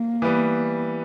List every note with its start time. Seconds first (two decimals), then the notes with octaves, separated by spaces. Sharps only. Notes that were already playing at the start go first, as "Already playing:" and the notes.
Already playing: A#3
0.22 E3 G3 B3